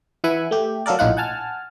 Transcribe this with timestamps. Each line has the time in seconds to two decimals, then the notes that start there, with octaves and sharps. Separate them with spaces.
0.24 E3 E4 F#5 G#5 B5
0.51 A3 G4
0.86 F#3 F4 A4 A#4 D5
0.99 A#1 A2 D#4 F4 F#5
1.17 F#5 G#5 A5 F6